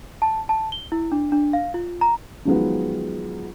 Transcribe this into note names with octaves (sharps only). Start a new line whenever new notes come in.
A5
A5
G7
E4
D4
D4
F5
F4
A#5
D#3 F3 F#3 G#3 B3